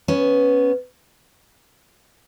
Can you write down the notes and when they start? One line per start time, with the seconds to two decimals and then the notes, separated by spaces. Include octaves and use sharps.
0.08 B3 C#4